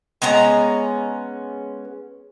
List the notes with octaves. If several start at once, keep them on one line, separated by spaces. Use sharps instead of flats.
G#3 B3 C#4 A#5